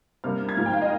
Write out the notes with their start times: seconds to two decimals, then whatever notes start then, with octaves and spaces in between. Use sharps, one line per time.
0.24 C3 G3 A#3 D4 F6
0.49 G#6
0.57 G#2 F3 A#3 F6
0.66 G5
0.74 F5
0.82 D#5